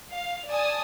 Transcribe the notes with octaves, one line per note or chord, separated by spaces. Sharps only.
F5
D5 G#5 A5 D#6